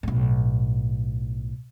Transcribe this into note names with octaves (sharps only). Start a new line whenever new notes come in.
B1 A2